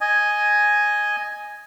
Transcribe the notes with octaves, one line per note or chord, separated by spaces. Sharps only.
D#5 G#5